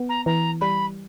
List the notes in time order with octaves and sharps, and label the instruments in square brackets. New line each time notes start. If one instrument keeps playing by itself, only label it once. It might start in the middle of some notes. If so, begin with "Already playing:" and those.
Already playing: [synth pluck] B3
[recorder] A#5
[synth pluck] E3 [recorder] A#5
[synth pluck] G3 [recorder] B5